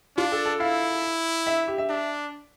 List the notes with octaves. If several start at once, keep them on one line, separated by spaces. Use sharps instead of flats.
D4 F4
A4
A4
E4 F5
E5
G4
E5
D4